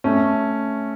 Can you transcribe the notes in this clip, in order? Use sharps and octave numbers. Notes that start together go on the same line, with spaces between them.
A3 C#4